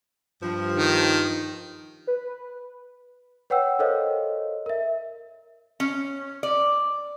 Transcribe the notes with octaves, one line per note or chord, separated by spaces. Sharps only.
G2 F3
D#3
B4
B4 C#5 F#5 G5 E6
A4 A#4 C5 C#5 D#5 F5
A#4 E5
C#4
D5